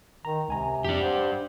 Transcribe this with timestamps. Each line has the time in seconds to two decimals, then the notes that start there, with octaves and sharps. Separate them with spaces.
0.25 D#3 A#5
0.48 C#2 C3 G#5 A#5
0.84 F2 D4 G4
1.01 C5 F#5 G5